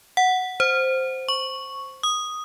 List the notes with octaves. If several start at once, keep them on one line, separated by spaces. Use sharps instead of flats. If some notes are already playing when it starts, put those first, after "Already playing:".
F#5
C5
C#6
D#6